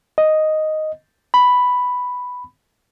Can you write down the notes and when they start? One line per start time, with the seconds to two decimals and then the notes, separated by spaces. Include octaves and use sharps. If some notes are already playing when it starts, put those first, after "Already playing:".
0.18 D#5
1.34 B5